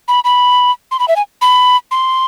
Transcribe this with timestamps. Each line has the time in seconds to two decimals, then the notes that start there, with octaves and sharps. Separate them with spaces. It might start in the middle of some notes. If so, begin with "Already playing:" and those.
0.08 B5
0.24 B5
0.91 C6
0.99 B5
1.08 E5
1.16 G#5
1.42 B5
1.91 C6